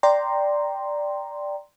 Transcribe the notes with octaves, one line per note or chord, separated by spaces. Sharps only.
D5 G5 A#5 C6